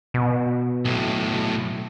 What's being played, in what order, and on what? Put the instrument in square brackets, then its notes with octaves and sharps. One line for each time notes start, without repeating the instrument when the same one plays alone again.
[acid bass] B2
[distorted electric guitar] B1 A2